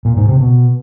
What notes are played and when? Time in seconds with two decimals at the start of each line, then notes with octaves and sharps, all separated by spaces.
0.05 A#2
0.17 G#2
0.28 C3
0.40 B2